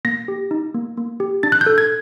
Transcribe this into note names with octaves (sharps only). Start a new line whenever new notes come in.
A#3 A#6
G4
D#4
A#3
A#3
G4
D4 A6
F#6
G6
A4
G#6